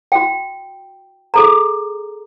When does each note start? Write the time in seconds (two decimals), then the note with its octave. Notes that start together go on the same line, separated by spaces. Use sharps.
0.12 F#4 G5
1.34 G#4 A4 A#5